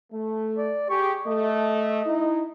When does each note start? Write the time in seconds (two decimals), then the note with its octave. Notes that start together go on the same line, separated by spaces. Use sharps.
0.12 A3
0.58 D5
0.90 G4 G#4 C#6
1.26 A3 D#5
2.06 D#4 E4